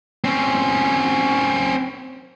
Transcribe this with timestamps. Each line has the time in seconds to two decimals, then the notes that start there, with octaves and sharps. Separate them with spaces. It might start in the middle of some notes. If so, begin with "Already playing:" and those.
0.24 C4 C#4